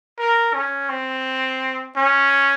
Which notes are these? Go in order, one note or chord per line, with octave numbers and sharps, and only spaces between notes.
A#4
C#4
C4
C#4